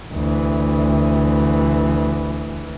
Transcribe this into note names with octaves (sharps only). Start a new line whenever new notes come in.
D2 E3